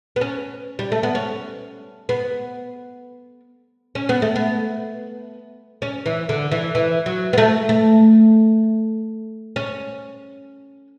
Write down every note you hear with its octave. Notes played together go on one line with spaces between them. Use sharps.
B3
C#4
G3
A3
B3
C#4
B3
C#4
B3
A3
B3
C#4
E3
D3
E3
E3
F#3
B3
A3
A3
C#4